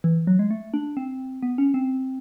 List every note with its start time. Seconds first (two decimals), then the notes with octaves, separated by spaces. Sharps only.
0.04 E3
0.27 F#3
0.39 G#3
0.51 A3
0.74 D4
0.97 C4
1.43 B3
1.58 C#4
1.74 C4